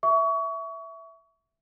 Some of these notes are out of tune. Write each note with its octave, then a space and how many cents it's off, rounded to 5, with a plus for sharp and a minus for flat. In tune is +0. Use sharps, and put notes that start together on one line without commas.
E5 +0 C#6 +30